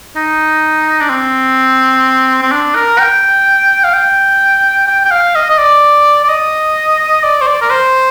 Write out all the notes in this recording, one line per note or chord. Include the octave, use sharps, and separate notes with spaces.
D#4
D4
C4
C4
D4
A#4
G5
F5
G5
G5
G5
F5
D#5
D#5
D5
D5
D#5
D5
C5
D5
A#4
C5